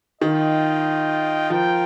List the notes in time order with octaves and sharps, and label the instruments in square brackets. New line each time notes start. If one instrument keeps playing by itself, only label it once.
[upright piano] D#3 [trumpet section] F4 D#5 G5
[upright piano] F3 [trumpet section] F4 A#4 G5